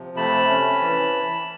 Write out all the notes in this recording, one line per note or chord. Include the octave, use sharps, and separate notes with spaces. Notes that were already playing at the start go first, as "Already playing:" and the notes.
Already playing: C3 F3
A3 A5 B5
C#4
E3